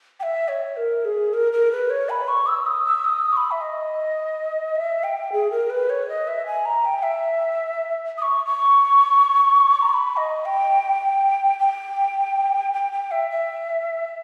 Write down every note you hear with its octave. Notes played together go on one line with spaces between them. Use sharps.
G5
E5
C#5
A#4
G#4
A#4
A#4
B4
C#5
B5
C#6
E6
D#6
E6
D#6
C#6
B5
E5
D#5
E5
G5
G#4
A#4
B4
C#5
D#5
E5
G#5
A#5
G5
E5
D#6
C#6
C#6
A#5
C#6
B5
D#5
G5
G5
G5
G5
E5
E5